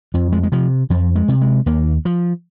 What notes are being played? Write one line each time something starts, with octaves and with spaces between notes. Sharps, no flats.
F2 F3
G#3
G#3
C3 F3
F2 F3
G#3
C3
G#3
D#2 A#3
F3